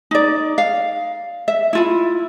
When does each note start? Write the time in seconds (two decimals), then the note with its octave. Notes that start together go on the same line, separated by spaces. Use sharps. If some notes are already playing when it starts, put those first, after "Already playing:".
0.11 D#4 D5
0.58 F5
1.48 E5
1.73 E4 F4 B5